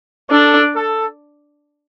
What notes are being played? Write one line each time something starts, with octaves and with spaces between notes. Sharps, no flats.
D4 A4
A4